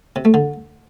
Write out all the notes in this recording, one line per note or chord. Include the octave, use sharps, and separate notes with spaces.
C3
A3
D3